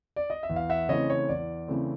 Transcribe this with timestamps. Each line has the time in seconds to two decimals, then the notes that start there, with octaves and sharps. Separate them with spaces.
0.16 D5
0.30 D#5
0.43 E5
0.50 E2
0.56 F5
0.70 E5 F#5
0.89 C#3 E3 A3 C4 C#5 D#5
1.10 C#5
1.29 E2 D5
1.68 C#3 E3 A3 C4